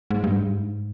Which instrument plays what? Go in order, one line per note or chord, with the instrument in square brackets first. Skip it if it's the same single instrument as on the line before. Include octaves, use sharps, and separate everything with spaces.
[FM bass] G#2
G2
G#2